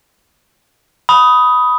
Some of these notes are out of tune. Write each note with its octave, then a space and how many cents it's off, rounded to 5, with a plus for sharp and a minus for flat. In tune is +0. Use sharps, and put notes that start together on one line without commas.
B5 +0 D#6 +10